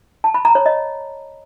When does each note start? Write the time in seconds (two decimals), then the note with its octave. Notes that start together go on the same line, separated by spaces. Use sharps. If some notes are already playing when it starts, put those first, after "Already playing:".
0.24 A5
0.34 B5
0.45 A#5
0.55 C#5
0.66 D#5